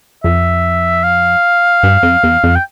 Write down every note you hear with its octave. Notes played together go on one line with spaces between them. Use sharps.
F2 E5
F5
G2
F2
E2
F2
G5